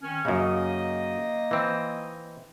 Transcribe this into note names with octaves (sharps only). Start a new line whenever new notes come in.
D#3 C#4
F#2 C#3 A#3 D#4 D#5
E3 C4